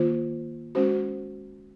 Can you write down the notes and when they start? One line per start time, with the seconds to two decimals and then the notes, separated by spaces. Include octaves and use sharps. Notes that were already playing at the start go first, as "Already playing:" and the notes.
Already playing: D#3 A#3 F4 C5
0.75 G#3 C#4 F#4 C5